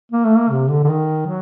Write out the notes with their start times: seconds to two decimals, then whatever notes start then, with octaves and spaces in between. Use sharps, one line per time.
0.12 A#3
0.25 A3
0.37 A#3
0.50 C3
0.69 D3
0.84 D3
0.89 D#3
1.27 F#3